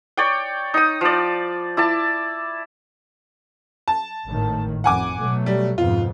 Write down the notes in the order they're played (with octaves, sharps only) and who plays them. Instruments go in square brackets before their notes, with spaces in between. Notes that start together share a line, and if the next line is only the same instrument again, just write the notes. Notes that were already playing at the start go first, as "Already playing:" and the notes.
[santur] C#5 D5 G5
D#4 D#6
F3 D5
E4 D5 A5
[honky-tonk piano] A5
[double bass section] G#1 A2 D#3
[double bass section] F2 [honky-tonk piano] F#5 G#5 D6
[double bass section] B2 F#3 A3
[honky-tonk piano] G3
[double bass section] F2 G#2 B2 [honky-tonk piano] F4